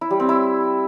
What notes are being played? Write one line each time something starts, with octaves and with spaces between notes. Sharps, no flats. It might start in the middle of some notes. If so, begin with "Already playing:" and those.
E4
G3
C4
E4